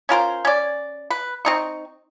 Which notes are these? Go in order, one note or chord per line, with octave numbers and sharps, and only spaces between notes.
C#4 F4 A#4 C5
C#4 D5
B4
C4 D#4 C#6